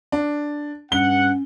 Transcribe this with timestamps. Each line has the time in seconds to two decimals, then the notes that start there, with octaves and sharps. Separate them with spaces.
0.12 D4
0.92 G2 C#4 F#5 G7